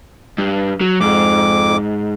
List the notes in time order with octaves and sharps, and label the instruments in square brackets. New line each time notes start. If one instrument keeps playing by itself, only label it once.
[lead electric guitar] G2
F#3
[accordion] F2 D6 [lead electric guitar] G#2